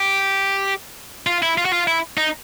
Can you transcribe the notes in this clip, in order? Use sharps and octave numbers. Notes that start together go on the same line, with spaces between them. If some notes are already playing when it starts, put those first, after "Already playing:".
Already playing: G4
F4
E4
F4
F#4
F4
E4
D#4